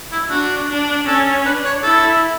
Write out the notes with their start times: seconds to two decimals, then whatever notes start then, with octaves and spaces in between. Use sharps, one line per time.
0.12 E4
0.30 D4 F#4
0.69 D4
1.07 C#4 A4
1.45 D4 B4
1.65 C#5
1.83 E4 A4